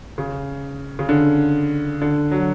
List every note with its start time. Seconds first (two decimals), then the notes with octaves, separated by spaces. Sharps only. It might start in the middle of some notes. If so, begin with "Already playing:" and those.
0.18 C#3
0.99 C#3
1.09 D3
2.01 D3
2.31 F#3